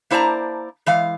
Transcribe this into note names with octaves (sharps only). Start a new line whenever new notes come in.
A#3 E4 C5 D5 A5 A#5
E3 G#3 F5